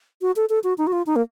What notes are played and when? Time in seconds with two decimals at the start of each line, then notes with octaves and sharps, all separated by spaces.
0.21 F#4
0.36 A4
0.49 A4
0.64 F#4
0.78 D#4
0.87 F#4
0.92 F4
1.06 D#4
1.16 A#3